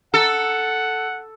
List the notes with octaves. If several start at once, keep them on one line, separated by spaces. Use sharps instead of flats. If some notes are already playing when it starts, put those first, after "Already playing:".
A4 F#5